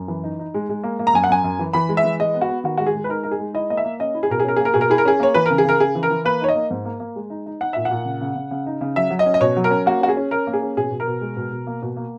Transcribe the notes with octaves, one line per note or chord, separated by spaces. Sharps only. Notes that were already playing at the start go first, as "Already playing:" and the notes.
Already playing: F#2
E3
D#4
D#4
G#3
G#3
A#3
A#3
A#5
F#2 G#5
F#5
F#2 G#5
F#2
E3
E3 B5
G#3
E5
E3
G#3 D#5
B3
F#4
B3
D#3 F#4
G#3 F#4
G#4
G#3
B4
D#4 A#4
D#4 A#4
G#4
G#3
E4 D#5
A#3 D#5
E5
A#3
C#4 D#5
E4
G#4
B2 A#4
G#4
C#4 A#4
G#4
A#3 A#4
B2 G#4
A#4
E4 G#4
A#4
C#4 G#4
A#3 C#5
E3 B4
C#3 A#4
G#4
C#3 A#4
C#3 G#4
E3
A#4
E3
A#3 B4
D#4 C#5
D#5
A#3
G#2
A#3
A#3
G#3
D#4
D#4
D#4 F#5
A#2 E5
F#5
A#2
C#3
C#3
C#3
C#3
D#4
C#3
F#3 E5
F#3
D#5
C#4
D#5
B2 C#5
F#3
A#4
C#4
A#3 F#4
C#4 F#4
G#4
C#4
C#4 A#4
A#3
G#4
C#4
B2 G#4
B2
A#4
B2
G#3
B2
B2
A#3
B2
A#3